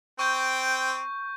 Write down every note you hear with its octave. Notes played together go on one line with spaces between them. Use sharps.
C4 G5 C#6 G6